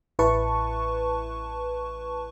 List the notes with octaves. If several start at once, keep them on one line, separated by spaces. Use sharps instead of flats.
A1 E4 B4 A5 C#6